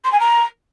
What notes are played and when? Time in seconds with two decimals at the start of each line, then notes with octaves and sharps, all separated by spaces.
0.04 C6
0.12 G#5
0.19 A#5